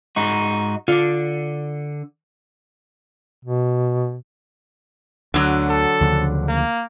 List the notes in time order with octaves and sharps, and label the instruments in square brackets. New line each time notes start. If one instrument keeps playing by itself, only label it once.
[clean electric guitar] G#2 D#4 F#4
[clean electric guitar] D3 [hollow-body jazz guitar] F4 D5
[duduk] B2
[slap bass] D2 [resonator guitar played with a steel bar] D3 F#3
[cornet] A4
[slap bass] D2 C#3 F3
[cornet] A#3